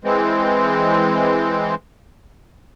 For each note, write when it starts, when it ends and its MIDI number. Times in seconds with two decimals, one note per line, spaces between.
0.04 1.75 52
0.04 1.75 56
0.04 1.75 60